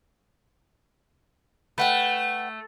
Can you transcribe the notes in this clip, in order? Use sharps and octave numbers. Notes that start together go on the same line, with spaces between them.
A3 B4 F#5 G5